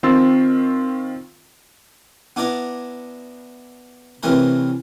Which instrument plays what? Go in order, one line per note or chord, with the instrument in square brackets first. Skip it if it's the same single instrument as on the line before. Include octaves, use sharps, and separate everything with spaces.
[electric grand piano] D#3 C4 F4 C6 E6 A6
[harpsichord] B3 D4 E4 D5 A#5
C3 E3 A3 C#4 A#4 B4